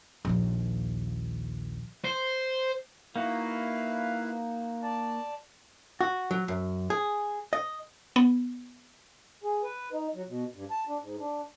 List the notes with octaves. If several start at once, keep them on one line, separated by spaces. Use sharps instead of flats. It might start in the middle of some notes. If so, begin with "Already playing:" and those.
A#1 D#2
C5
A#3 D#4 E4 F#4 B4 F5
D5 A5
F#4
F#3
F#2
G#4
D#5
B3
G#4
B4
D#4
F#3
B2
G2
A5
D4
G#2
D4